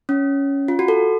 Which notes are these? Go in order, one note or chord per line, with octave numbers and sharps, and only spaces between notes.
C#4
F4
F#4
A4